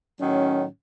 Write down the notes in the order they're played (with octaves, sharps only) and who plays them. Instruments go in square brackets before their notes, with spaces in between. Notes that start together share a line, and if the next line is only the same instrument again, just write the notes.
[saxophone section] A2 D#3 F#3 [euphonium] C#4